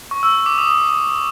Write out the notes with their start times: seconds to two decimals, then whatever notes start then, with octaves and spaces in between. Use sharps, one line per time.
0.11 C#6
0.23 E6
0.35 E6
0.46 D6
0.58 D#6